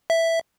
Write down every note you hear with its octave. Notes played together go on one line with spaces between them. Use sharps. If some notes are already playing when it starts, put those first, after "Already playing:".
E5